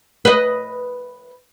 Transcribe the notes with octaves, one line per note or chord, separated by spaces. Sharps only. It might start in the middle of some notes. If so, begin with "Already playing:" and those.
B4 D#5